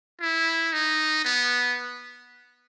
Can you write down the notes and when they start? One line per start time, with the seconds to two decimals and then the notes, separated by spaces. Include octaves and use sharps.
0.21 E4
0.73 D#4
1.25 B3